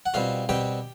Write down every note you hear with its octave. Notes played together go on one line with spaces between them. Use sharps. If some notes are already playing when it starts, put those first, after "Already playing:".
F#5
B2 G3 C4 F4 F5
B2 G3 C4 G4 G5